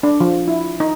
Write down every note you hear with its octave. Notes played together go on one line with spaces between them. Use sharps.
D4
F3
E4
D#4